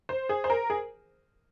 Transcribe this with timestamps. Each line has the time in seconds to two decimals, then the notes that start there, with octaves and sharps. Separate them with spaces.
0.09 C5
0.29 G#4
0.44 C5
0.50 A#4
0.70 G#4